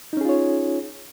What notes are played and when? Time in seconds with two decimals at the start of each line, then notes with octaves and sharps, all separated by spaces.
0.13 D#4
0.17 C#4
0.21 G#4
0.25 F4
0.29 C#5